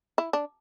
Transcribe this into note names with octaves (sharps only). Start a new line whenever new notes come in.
E4
D4